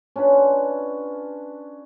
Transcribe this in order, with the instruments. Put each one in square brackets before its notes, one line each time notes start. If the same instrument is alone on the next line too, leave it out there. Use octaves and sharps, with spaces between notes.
[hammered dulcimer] C#4 D4 F4 B4